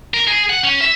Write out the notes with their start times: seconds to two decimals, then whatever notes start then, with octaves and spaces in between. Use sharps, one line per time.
0.14 A#4
0.27 G#4
0.49 F#5
0.64 C#4
0.81 E5